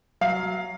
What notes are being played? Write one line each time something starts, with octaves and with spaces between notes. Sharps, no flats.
F#3 F5